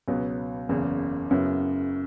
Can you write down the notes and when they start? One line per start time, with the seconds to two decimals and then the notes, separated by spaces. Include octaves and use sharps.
0.08 C#2 B2 F#3 B3
0.69 F#1 E2 C#3
1.31 F#2 C#3 F#3 B3 E4